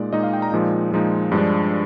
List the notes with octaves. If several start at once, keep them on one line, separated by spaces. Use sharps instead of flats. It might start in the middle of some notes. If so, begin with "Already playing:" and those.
Already playing: A#2 G#3 D#4 D5
A#2 G#3 D#4 D#5
F5
G5
A#5
A#2 F3 G#3 D#4
A#2 F3 G#3 D#4
G2 F3 G#3 D4